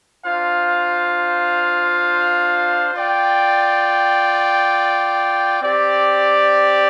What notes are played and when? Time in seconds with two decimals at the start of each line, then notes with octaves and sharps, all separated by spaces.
0.24 D4 F4 C5 F5
2.94 F4 D5 G5
5.62 C4 G4 D5